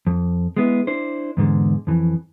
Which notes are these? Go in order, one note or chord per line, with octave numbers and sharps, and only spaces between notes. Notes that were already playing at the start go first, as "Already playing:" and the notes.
F2
G#3 B3 E4
D4 E4 C5
E2 G#2 D3 G#3
F2 E3